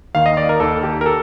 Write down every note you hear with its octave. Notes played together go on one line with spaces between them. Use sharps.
D#2 D#3 F5
D#5
D5
A#4
D#2 D#3 A4
G4
A#4
A4